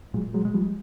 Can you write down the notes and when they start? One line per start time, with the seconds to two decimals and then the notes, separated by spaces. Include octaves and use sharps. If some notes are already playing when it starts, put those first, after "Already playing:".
0.14 A#2 F#3 G#3
0.34 F#3 G#3
0.45 G#3
0.54 F3 G3